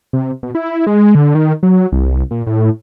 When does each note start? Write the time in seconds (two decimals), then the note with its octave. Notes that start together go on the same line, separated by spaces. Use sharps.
0.13 C3
0.43 B2
0.55 E4
0.87 G#3
1.15 D3
1.35 D#3
1.63 F#3
1.92 C2
2.31 A#2
2.47 A2